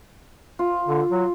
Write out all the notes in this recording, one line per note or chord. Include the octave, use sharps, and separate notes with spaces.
F4
D3
F#3